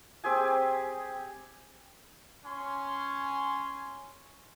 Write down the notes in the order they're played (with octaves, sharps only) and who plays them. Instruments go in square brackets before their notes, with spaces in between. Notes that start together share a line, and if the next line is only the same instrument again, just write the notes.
[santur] C4 G4 G#4 G#5
[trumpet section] C#4 G#5 C6